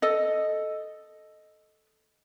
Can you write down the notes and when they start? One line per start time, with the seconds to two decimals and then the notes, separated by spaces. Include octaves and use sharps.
0.02 A4 D#5